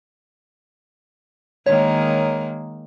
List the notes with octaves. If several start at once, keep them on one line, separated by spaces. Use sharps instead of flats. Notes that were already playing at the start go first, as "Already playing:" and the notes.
D#3 G#3 A#3 C#5